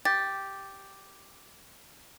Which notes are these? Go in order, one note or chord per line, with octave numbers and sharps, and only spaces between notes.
G4 A6